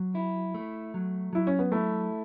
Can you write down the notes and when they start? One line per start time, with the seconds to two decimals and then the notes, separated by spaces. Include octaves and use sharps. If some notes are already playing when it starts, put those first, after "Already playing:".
Already playing: F#3
0.15 E4
0.54 A3
0.94 F#3
1.33 F#3 E4
1.47 C#4
1.59 B3
1.72 A3 E4